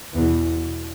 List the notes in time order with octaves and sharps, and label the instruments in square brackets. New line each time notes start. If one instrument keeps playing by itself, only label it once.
[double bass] E2 B2
B2